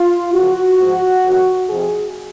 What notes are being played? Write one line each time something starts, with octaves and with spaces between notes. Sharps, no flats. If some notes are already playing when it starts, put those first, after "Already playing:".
Already playing: F4
F#2 C#3 F3 F#4
G#2 F3
F2 C3 D#3
F2 C3 F3 G#4